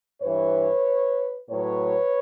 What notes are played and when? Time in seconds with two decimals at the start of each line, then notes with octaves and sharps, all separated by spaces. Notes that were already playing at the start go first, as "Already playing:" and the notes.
0.21 G2 E3 B4 C#5
1.50 A2 F#3 B4 C#5